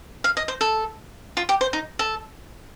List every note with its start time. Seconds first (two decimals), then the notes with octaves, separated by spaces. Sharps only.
0.24 F5
0.37 D#5
0.48 C5
0.61 A4
1.37 F4
1.49 G4
1.61 C5
1.73 D#4
1.99 A4